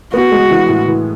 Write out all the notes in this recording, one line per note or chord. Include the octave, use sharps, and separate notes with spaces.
B3 F#4
G#3
E3
A2
E3